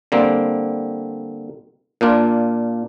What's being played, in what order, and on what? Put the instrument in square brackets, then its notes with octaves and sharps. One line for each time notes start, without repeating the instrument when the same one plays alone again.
[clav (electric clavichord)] D3 G3 A#3 C4
A#2 A#3 D4 F4